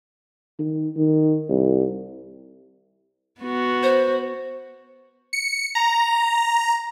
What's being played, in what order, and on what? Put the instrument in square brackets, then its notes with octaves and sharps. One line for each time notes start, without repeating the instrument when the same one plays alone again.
[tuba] D#3
D#3
C2
[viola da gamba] B3 F#4
[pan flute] C5
[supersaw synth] C#7
A#5